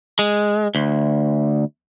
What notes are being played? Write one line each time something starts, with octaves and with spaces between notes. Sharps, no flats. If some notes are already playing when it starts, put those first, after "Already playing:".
G#3
D2